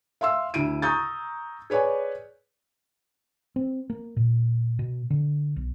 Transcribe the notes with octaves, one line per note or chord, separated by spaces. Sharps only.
E5 F5 C6 E6
D2 E4 D7 D#7
A#5 C#6 D#6 G6 A6
G#4 B4 C#5 D5 G#5
C4
A#3
A#2
B2
D3
B1